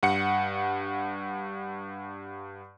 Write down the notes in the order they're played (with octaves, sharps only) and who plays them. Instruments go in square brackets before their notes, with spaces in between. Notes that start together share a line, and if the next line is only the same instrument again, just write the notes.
[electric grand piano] G2 F#5 C#7